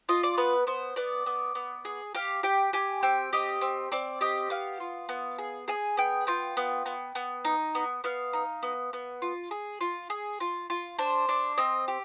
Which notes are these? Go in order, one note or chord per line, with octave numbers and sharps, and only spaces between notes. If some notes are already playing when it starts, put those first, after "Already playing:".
F4 D#5
D5
B3 B4
B3 C5
B3 D5
B3
B3
G#4
G4 F5
G4 G5
G4 G#5
C4 G5
G4 D#5
C4
C4 D5
G4 D#5
B3 F5
F4
B3
G#4
G#4 G#5
B3 G5
F4 G5
B3
B3
B3
D#4
B3
B3 F5
D#4
B3
B3
F4
G#4
F4
G#4
F4
F4
D4 C5
D4
C4 D#5
G4